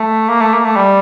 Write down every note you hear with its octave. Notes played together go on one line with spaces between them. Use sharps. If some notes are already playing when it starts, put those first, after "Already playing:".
Already playing: A3
A#3
A3
A#3
A3
G3